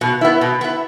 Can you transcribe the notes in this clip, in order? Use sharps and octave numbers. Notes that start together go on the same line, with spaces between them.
B2
B3 E4
B2
B3 E4